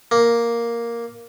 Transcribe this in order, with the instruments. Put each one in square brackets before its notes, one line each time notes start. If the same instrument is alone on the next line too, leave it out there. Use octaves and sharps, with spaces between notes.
[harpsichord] A#3